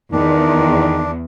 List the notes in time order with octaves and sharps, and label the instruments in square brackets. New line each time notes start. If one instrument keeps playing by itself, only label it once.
[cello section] E2 [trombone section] D#3 [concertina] D4